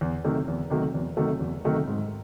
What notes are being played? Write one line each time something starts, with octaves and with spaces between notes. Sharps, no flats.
E2
C3 D#3 F#3 A3
E2
C3 D#3 F#3 A3
E2
C3 D#3 F#3 A3
E2
C3 D#3 F#3 A3
G#2